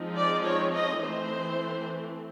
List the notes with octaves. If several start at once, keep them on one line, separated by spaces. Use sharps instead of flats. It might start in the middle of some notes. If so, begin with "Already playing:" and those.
Already playing: F3 G#3 C4 D#4
D5
C#5
D#5
E3 A3 C4 C5